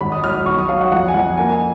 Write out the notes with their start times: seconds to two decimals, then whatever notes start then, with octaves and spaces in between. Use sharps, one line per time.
0.01 G#1 B5
0.12 D#6
0.23 F#3 F6
0.34 D#6
0.46 B1 C#6
0.58 D#6
0.69 F#3 F5
0.81 F#5
0.92 F2 F#5
1.08 G#5
1.14 F2 F#5
1.37 A#3 G#5
1.49 G#5